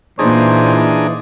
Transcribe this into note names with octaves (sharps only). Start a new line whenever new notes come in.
A#2 E3 A#3 D4 D#4 F4 G#4 C5